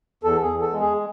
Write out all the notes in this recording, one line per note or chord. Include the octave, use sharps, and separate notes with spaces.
E2 A4
G#4
E2
A4
G#3
G#4